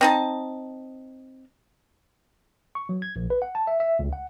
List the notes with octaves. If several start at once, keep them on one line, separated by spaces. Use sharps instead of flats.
C4 D#4 A5
C#6
F#3
G#6
A#1
B4
F#5
A5
E5
E5
C#2
F#5